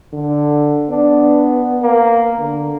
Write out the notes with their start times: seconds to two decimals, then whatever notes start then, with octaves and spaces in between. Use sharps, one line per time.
0.13 D3
0.90 B3 D4
1.83 A#3
2.39 D3